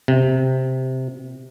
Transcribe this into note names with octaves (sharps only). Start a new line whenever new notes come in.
C3